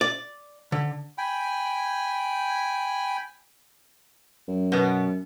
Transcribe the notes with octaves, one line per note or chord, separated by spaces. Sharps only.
D5
D3
G5 G#5 B5
F#2
B2 B3